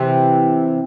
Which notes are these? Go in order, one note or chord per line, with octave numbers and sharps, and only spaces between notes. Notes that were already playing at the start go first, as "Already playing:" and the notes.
Already playing: C3 E3